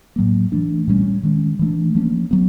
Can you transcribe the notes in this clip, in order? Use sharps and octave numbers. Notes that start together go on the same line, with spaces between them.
A2 F#3 A#3
E3 A3 D4
A#2 G3 A#3 C#4
D#3 G#3 C#4
E3 A3 D4
F3 A#3 C#4
F#3 B3